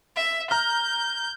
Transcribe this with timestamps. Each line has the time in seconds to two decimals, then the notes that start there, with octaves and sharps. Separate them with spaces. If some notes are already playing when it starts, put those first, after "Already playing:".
0.17 E5
0.51 A#5 F6 G6